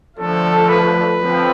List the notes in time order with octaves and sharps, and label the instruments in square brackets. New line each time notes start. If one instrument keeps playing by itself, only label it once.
[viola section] D3 F3 A3 D4 F4 [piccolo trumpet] A4
[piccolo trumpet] B4
[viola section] D3 F3 C4